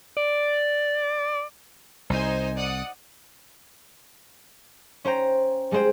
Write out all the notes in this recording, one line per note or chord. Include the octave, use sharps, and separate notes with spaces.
D5
C2 D#4 C5 G#5
D5 F#5 D#6
C#4 C5 G5 A#5
G3 G#3 G#4 C5 G5